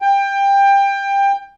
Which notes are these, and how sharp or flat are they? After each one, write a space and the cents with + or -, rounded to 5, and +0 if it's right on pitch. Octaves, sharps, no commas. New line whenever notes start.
G5 +20